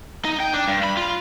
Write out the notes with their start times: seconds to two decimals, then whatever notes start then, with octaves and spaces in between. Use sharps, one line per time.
0.25 D#4
0.40 G5
0.54 D4
0.68 G2
0.84 B5
0.97 F4